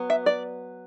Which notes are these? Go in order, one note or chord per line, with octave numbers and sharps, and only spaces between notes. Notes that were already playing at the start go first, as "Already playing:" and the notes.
Already playing: F#3 B3
E5
D5